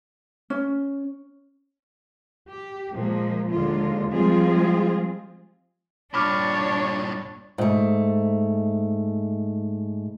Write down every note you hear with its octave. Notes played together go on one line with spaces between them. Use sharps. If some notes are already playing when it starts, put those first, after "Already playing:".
C#4
G4
A#2 F3 G#3 A#3
D#2 D3 G#3 F4
F3 G3 G#3 C4 F4 G#4
G2 A#2 D4 C#5 B5 D6 F6
G#2 A3